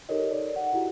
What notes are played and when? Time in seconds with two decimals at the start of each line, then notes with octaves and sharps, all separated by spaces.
0.09 D#4 G4 A4 A#4 C#5 D#5
0.31 A4 D5
0.56 F#5
0.73 E4 F#4 G4